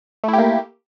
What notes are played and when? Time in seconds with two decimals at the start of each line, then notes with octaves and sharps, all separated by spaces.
0.24 A3
0.28 E4
0.33 G4
0.38 A#3